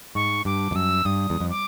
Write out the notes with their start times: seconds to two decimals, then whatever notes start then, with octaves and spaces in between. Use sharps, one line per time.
0.15 G#2 C#6
0.45 G2 D6
0.71 F2
0.75 F#2 E6
1.05 G2 D#6
1.30 E2
1.40 F2
1.50 D6